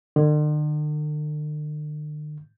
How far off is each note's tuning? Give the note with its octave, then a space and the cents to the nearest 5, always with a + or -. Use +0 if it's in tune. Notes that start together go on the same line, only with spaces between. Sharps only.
D3 +45